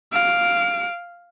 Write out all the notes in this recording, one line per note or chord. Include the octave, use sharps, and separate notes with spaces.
F5 D7